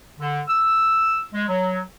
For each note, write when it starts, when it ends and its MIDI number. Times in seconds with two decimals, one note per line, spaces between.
0.20 0.41 50
0.48 1.21 88
1.33 1.43 56
1.48 1.79 54